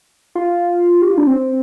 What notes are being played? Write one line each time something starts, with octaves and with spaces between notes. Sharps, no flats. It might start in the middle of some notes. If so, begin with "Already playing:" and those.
F4
G4
F4
D4
C4